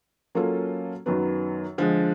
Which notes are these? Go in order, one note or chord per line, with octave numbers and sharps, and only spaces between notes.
F#3 A#3 C#4 F4 A4
F#2 D#3 F#3 B3
D3 F3 G#3